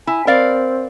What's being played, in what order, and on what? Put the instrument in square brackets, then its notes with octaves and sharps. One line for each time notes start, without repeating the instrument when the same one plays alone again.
[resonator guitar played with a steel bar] E4 [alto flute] G#5
[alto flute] C4 [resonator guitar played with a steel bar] A#4 D5 F5